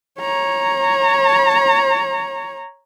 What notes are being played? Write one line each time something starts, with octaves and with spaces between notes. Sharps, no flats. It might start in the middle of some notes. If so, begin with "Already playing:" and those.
C#5 A#5